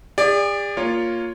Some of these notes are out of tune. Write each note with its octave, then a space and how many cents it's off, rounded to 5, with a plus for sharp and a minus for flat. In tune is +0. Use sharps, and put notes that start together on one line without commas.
G#4 -45 D5 +0
A#3 +0 F4 +0 C#5 +5